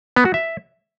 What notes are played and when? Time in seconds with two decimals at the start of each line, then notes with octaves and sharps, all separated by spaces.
0.16 B3
0.25 F#4
0.34 E5